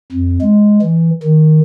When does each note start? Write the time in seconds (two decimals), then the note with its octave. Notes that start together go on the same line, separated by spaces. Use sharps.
0.12 F2
0.42 G#3
0.82 E3
1.23 D#3